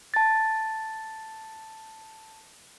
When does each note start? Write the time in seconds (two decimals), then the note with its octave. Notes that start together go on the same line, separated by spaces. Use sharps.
0.14 A5 A6